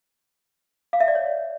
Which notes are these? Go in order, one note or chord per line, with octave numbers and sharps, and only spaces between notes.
F5
E5
D5
C#5